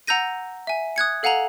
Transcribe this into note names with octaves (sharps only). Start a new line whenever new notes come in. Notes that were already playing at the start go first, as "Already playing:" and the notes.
F#5 A#5 E6 G6 A#6 D#7
E5 G#5
D#6 F#6 G#6 C#7
A4 F5 F#5 G#5 A#5 F#7